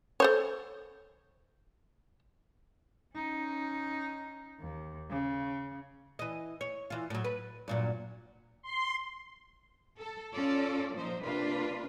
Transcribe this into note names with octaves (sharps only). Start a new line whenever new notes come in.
A4 C5 C#5
C#4 D#4
D#2
C#3
E3 D#5
C#5
E3 F4
A2 F#3
B4
G2 A#2 F#3
C6
A4
C#4 F4 A4 D5
A#2 F3 D#4 C5
C3 A#3 D4 F4 B4